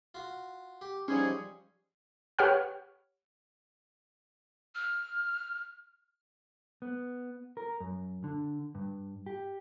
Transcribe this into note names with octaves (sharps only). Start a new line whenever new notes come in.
F4 F#4
G4
G#2 F3 G3 C#4 G#4 C5
G4 B4 C#5 F#5 G5 F6
F6
B3
A#4
F#2
D3
G2
G4